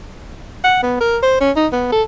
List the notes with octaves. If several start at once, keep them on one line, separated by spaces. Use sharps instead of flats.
F#5
B3
A#4
C5
C#4
D#4
B3
A4